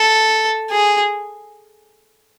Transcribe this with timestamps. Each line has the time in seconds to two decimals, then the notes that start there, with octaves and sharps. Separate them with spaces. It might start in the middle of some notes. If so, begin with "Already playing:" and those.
Already playing: A4
0.71 G#4